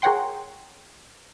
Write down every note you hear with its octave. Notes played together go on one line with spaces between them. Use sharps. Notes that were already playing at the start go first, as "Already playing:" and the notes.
G#4 A#4 C#5 F#5 G5 C6